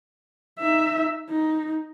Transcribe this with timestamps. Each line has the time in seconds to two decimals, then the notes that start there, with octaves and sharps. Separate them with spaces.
0.59 D#4 E5
1.29 D#4